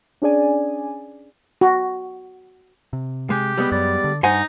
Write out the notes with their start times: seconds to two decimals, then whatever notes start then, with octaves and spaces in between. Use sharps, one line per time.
0.22 C#4 D4 G#4 D5 G#5
1.61 F#4
2.93 C3
3.30 G#3 G4
3.58 G3 G#3 B3
3.72 F#2 D5
4.04 D3
4.23 G2 D#4 C5 F#5 G#5